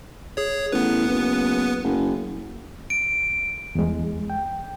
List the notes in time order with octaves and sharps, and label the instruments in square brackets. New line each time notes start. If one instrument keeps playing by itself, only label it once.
[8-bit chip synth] G#4 C#5
[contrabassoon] A1 [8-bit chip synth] B3 B4
[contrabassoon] F#1
F#1
[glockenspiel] D7
[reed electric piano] E2 G#3
G5